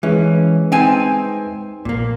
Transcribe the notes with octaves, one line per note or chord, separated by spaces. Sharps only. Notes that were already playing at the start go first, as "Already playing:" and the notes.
E3 G#3 C#4 B4 E5
C4 D#4 G#5 A5
A#1 A#2 A#3